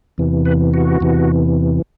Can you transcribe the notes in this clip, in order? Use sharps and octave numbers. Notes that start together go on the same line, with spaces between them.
E2 C3 E3
B4
F#4
E2 C3 E3